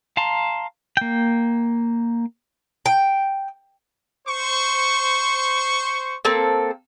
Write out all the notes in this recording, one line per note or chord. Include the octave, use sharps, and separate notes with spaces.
F5 A5 A#5 C6
A#3 G5
G5
C5 C#6
A#3 C4 A4